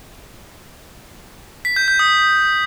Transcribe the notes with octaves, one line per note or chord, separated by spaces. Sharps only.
B6
G6
G6
D#6